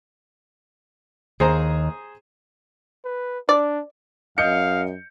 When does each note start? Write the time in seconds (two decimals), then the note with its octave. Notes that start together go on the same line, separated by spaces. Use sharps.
1.40 D#2 G#4 C5 A#5
3.04 B4
3.49 D4 D5
4.38 F#2 D#5 F5 G6 C#7